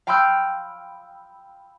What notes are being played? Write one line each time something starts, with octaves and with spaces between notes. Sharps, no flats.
F5 G5 B5 C6 E6 G6